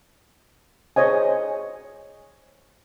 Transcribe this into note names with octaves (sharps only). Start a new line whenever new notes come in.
G#4 C5 C#5 D#5 G#5